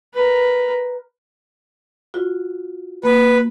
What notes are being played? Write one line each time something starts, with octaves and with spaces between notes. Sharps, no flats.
A#4 B4
F4 F#4
A#3 B4